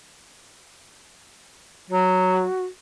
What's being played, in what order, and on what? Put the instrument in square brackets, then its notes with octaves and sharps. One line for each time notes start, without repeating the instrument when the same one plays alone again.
[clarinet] F#3 [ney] F#4